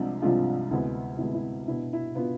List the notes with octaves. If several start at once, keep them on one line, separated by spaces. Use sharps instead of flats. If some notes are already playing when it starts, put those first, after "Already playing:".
Already playing: C2 C3 F3 G#3 D4
C2 C3 F3 G#3 D4 F4
D2 C3 G#3 B3 E4
D2 C3 G#3 B3 E4
E4
B2 B3 D4 E4
E4
B2 B3 D4 F4